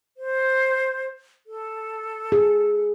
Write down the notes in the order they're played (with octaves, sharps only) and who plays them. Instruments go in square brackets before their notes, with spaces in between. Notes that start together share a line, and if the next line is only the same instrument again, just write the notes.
[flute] C5
A4
[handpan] G#4